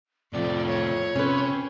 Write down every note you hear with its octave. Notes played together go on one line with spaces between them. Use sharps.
F2 A2 C3 D5
C#5
C3 C#4 B4